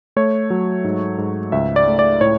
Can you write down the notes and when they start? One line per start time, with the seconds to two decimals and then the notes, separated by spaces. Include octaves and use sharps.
0.16 A3 C#5
0.50 F#3
0.84 G#2
1.18 G#2
1.52 C#2 E5
1.76 D5
1.87 A3
1.99 D5
2.21 A2 C#5